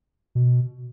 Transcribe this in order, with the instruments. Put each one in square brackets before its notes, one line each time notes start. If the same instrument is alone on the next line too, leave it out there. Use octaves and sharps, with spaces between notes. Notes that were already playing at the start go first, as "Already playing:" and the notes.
[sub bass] B2